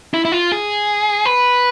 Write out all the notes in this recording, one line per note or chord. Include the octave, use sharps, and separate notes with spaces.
E4
E4
F4
G#4
B4